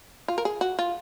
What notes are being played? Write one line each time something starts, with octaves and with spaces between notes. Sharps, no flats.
F4
A#4
G#4
F#4
F4